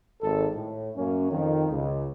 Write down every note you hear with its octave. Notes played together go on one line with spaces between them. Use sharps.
G#1 A4
A2
F#2 A#3 C#4
F2 D#3
C#2